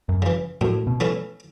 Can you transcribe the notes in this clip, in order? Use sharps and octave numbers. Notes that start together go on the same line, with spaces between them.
F#2
C#3 E3
F#2 A2
B2
E3 A3 C#4 E4